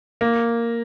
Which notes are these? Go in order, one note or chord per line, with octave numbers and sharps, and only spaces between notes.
A#3